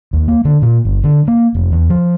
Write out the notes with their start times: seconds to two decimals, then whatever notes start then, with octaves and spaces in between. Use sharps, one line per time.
0.13 D#2
0.28 A#3
0.45 D3
0.62 A#2
0.85 G1
1.04 D3
1.28 A#3
1.55 F1
1.72 E2
1.90 F3